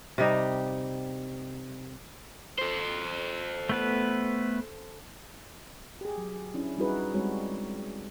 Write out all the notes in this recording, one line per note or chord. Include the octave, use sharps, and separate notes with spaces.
C3 G3 D#4
A4 C5
A3 B3 B4
G4 G#4
F#3
C#4 D4 E4 G4
G3 D#4 E4 F#4 G#4 B4
G3 G#3 C4 F#4 C#5